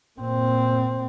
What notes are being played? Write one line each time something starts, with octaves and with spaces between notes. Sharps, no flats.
A#2 C4